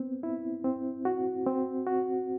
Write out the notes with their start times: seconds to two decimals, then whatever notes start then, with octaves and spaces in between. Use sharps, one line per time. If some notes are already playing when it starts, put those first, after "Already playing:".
Already playing: B3 C4
0.23 E4
0.64 C4
1.05 F#4
1.47 C4
1.87 F#4